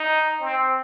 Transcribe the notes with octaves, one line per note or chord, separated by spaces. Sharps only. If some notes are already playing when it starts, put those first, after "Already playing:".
Already playing: D#4
C4